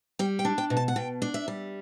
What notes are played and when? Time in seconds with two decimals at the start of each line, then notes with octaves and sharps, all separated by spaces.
0.19 G3 G5
0.39 G5
0.45 D4
0.58 G5
0.70 B2
0.77 A5
0.88 F#5
0.96 B2 G5
1.22 D4
1.34 E5
1.48 G3